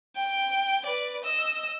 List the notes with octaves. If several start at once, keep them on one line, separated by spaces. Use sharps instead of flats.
G5
B4 D5
D#5 E6